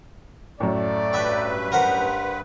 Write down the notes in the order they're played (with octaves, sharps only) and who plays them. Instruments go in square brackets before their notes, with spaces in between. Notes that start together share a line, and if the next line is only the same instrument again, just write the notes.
[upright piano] F#2 A2 [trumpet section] A3 D5
[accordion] G2 B4 [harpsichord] E5 G5
[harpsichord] A#4 C5 F#5